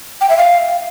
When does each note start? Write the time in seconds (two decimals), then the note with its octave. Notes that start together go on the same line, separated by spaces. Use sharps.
0.21 G5
0.29 E5
0.38 F5